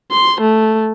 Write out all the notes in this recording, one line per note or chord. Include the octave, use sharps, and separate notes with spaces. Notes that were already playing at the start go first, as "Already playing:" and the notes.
C6
A3